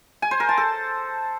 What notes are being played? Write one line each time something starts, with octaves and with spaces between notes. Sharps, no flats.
G#5
C5
A#4
A5
A4